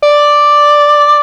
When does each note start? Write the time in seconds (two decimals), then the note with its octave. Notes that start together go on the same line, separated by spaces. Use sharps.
0.02 D5